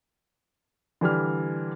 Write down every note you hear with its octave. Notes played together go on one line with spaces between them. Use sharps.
D3 E3 G3 F6